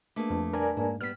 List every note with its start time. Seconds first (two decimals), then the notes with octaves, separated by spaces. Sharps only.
0.16 A3 A#3 D4 G#4 B4 A5
0.30 F2
0.53 G3 A#4 D5 G#5
0.77 G#2 A#3
1.01 G3 B3 F6 B6